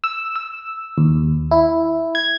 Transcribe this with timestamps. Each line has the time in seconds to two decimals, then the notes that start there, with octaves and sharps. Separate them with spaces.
0.04 E6
0.36 E6
0.98 D#2
1.51 E4
2.15 G#6